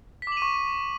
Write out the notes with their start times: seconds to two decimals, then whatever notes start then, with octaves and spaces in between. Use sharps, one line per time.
0.22 B6
0.27 D6
0.32 F#7
0.37 D#7
0.42 C#6